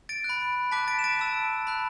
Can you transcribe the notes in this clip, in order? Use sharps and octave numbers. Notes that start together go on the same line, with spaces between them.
A6 D7
F#6
B5
A5 D6 F#6 B6
A6 D7
E7
A6 D7
A5 E6
B5 F#6